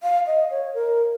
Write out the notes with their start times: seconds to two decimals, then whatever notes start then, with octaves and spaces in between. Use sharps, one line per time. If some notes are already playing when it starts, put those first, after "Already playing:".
0.03 F5
0.27 D#5
0.51 C#5
0.75 A#4